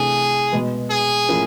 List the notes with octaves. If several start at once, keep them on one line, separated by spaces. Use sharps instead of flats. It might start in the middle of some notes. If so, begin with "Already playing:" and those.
Already playing: C3 E3 A3 D4 G#4
B2 G#3 B3
G#4
A2 F3 A#3 C#4 E4